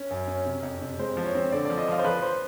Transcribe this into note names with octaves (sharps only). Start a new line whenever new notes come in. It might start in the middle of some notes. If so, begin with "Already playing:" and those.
Already playing: C#4
F#2
C#4
C3
F2
C3
G#3 C5
F3
C#5
C4
D3 D5
D5
F3
D#5
F3 F5
C5
F3 B4
C5